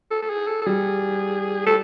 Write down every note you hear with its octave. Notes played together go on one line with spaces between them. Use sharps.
A4
A4
G#4
A4
A4
G3 G#4
A4